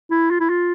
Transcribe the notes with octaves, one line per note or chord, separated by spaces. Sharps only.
E4
F4
E4
F4